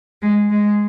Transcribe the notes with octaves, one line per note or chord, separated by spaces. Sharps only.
G#3
G#3